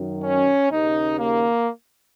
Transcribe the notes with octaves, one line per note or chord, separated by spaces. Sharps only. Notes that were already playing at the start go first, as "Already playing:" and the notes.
Already playing: F#2 D#3
C#4
D#2 C#3 D#4
A#3